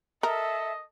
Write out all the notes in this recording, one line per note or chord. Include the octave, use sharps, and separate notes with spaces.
A4 A#4 D#5 E5